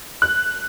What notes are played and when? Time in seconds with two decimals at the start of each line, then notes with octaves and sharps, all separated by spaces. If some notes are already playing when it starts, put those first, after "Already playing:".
0.22 F#6